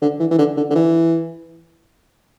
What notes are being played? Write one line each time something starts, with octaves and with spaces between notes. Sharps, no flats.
D3
E3
E3
D3
D3
D3
E3